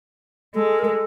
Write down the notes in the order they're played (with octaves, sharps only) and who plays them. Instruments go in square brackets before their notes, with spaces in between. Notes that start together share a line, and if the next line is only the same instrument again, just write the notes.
[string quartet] G#3 [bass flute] A4
[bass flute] A#4
A4